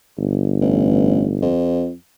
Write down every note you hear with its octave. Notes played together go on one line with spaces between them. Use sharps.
G1
A1
F2